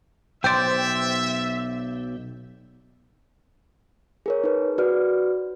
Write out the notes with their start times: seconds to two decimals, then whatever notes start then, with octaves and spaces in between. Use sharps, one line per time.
0.44 B1 C5 D5 E5 G5
4.26 G#4 A#4 C#5
4.44 D#4 B4
4.78 F#4 B4 D5 F6